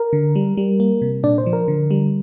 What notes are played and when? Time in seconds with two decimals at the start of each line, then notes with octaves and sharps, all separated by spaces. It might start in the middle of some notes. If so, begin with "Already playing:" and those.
Already playing: A#4
0.13 D3
0.36 G3
0.57 G3
0.80 A#3
1.02 C3
1.23 A#2 D4 D5
1.38 C5
1.46 F3
1.53 A#4
1.68 D3
1.91 G3